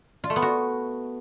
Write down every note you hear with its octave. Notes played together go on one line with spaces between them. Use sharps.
F4
A3
B3
F#4